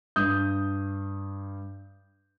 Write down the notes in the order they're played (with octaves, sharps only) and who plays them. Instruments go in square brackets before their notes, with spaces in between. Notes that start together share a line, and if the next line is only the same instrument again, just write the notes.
[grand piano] G2 D#6 G6